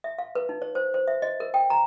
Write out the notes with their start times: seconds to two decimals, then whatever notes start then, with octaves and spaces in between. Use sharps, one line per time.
0.04 E5
0.19 F5
0.35 B4
0.49 D#4
0.62 C#5
0.75 C5
0.94 C5
1.08 E5
1.22 D#5
1.40 A#4
1.54 G5
1.70 A#5